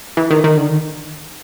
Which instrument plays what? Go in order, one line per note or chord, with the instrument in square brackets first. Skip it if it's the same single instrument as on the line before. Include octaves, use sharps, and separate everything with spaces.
[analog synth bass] E3
D#3
D#3
D3
D#3